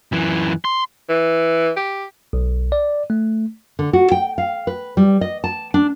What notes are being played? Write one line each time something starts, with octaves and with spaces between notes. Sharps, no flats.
F#2 E3
C6
E3
G4
B1
D5
A3
D3
F#4
G5
F5
B4
G3
D#5
A5
D4